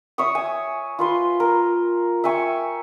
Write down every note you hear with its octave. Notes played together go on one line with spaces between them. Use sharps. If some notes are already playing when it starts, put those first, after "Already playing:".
C#5 E5 C#6 D#6
G#5
F4 B4 C6
A#4
E5 G5 G#5 C#6